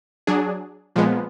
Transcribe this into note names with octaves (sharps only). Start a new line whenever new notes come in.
F#3 D4 G#4
A#2 F3 G#3 B3